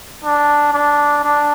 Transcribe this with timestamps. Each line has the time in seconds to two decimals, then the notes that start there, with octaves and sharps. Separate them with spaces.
0.24 D4
0.73 D4
1.24 D4